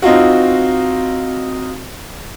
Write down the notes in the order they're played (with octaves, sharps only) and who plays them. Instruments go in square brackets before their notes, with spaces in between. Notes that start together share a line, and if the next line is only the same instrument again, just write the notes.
[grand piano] C4 D#4 F4 F#4